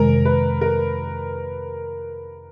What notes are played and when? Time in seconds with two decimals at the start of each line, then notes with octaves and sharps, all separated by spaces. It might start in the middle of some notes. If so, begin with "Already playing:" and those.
Already playing: F2 C3 D#3 G#3 A#4
0.25 B4
0.61 A#4